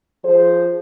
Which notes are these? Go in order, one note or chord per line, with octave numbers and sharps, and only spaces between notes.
F3 G#4 C5